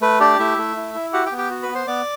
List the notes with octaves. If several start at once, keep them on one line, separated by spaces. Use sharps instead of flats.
A3 B4
D4 G4 D5
A3 E4 E5
A3
E4
E4
F#4 G4 F#5
G4 G5
B3
G4 G5
F#4
B4 B5
B3
C5 C6
B3 D5 D6